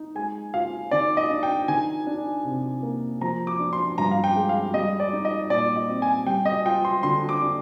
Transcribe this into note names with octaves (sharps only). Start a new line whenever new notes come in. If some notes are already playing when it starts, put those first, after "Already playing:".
Already playing: D#4
G#3 G#5
F4 F5
D#3 D5
D#5
D4
G5
D#3 G#5
D4
C3
A#3
F3 A#5
D6
D4
C6
G2 A#5
F5
G5
G#3
F5
G3 D#5
D5
D#4
D#5
A#2 D5
D#5
C4
G#5
G3 G5
D#5
F4 G5
C6
D3 C6
D6
D4